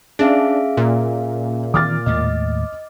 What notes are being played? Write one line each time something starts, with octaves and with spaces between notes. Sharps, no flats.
C#4 D4 G#4 E5 F5
A#2
D#3 E3 C4 D6 F6 A6
D#2 A2 G#3 D#5